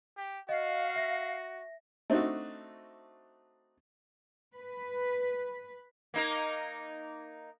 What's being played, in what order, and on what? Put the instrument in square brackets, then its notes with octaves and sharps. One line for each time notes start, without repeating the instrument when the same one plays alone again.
[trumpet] G4
[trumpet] F#4 [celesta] D#5 [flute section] F5
[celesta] E5 A#6
[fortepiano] A3 C4 D4 D#4 F#4
[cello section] B4
[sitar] A#3 D#4 A#4